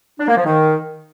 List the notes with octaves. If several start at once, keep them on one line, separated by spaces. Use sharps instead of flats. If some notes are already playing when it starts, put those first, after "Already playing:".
D4
A#3
F3
D#3